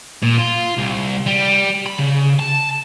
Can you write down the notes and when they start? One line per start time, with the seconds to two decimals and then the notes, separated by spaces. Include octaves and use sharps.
0.22 A#2
0.38 F4
0.77 C2
1.27 G3
1.87 B5
1.99 C#3
2.40 A5